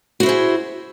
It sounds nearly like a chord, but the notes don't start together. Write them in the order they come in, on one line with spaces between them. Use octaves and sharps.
F#4 E4 C5 G#4